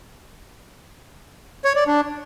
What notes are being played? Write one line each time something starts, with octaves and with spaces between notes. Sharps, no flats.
C#5
D5
D4